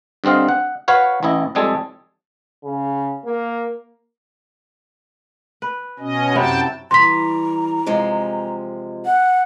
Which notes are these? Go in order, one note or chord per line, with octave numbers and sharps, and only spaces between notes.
G2 D3 C4 D#5 F5
F#5
F#4 B4 C#5 F5 F#5
A1 E3 E4 D#5
F2 G3 G#3 G#4 A4
C#3
A#3
B4
B2 C#4 D#5
F#2 C3 F#3 E4 G5 A5
E3 G3 A#5 C6 B6
C3 F3 G#3
F#5